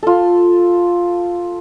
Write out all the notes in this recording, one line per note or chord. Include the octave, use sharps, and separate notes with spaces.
F4 A4